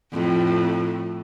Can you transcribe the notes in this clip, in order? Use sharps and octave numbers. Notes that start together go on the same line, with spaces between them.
F2 A2